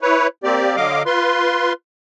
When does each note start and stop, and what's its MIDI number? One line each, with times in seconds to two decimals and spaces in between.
0.01 0.27 64
0.01 0.27 71
0.01 0.27 73
0.44 0.76 58
0.44 0.76 60
0.44 0.76 67
0.44 0.76 74
0.76 1.03 50
0.76 1.03 54
0.76 1.03 75
0.76 1.03 77
0.76 1.03 86
1.06 1.73 65
1.06 1.73 71
1.06 1.73 84